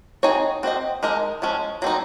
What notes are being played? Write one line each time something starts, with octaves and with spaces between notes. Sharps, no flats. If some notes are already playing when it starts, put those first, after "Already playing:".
F#3 C4 D#4 G#4 C#5
C4 F#4 C5 D#5
G#3 D#4 A#4 D#5
F3 G#3 C#4
F#3 C4 D#4